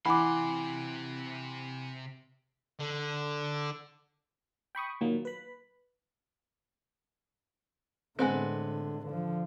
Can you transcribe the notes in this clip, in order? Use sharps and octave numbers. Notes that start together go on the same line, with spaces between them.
C3 E3 F#5 B5 C6 D6
D3
G5 B5 C#6 D#6
A#2 D#3 F#3 A#3
B4 B5
A2 D3 G#3 B3 C4
D3 F3